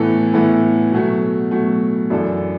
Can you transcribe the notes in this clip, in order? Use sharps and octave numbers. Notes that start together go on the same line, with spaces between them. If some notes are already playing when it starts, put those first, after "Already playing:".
Already playing: A2 E3 B3 E4 A4
A2 E3 B3 E4 A4
B2 F#3 A3
B2 F#3 A3
F#2 E3 D4 A4